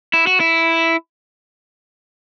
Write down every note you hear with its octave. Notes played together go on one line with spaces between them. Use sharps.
E4
F#4
E4